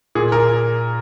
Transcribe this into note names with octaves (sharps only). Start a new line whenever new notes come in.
A#2 G#4
A#2 A#4